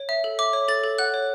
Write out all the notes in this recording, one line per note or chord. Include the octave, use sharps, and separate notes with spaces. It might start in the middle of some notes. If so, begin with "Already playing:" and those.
Already playing: C#5
E5
A4
E5 D6
C#5
A4 A6
A4
F#5 F#6
C#5